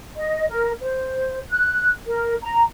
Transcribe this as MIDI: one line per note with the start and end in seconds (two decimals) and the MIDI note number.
0.17 0.48 75
0.49 0.71 70
0.81 1.39 72
1.49 1.89 90
2.06 2.34 70
2.42 2.62 82